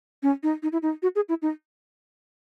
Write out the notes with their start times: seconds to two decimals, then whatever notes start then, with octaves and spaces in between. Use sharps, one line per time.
0.23 C#4
0.43 D#4
0.63 D#4
0.72 E4
0.82 D#4
1.02 F#4
1.16 G#4
1.29 E4
1.42 D#4